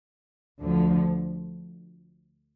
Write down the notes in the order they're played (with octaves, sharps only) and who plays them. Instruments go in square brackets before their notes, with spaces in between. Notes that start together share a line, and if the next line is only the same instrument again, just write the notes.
[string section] D2 D3 F3